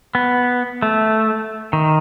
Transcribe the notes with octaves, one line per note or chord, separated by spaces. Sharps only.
B3
A3
D#3